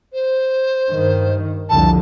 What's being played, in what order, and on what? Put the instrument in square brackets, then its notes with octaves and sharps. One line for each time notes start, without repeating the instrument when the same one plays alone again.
[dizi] C5
[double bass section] G2 D#3
[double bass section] C2 F2 D3 [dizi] A5